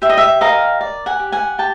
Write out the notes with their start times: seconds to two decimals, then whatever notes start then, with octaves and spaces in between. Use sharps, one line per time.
0.02 G4 E5
0.09 D#5
0.17 E5
0.41 A#4 D#5 F5
0.81 D5
1.06 F#5 G#5
1.20 G4
1.32 F#5 G#5
1.58 G4 G5 A5